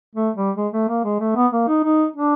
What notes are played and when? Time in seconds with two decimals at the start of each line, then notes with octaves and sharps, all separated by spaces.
0.15 A3
0.36 G3
0.57 G#3
0.73 A3
0.89 A#3
1.05 G#3
1.20 A3
1.36 B3
1.53 A#3
1.68 D#4
1.84 D#4
2.16 D4